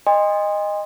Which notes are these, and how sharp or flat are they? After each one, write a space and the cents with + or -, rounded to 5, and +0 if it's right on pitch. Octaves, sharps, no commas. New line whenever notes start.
D#5 -10 G#5 -45 C6 +0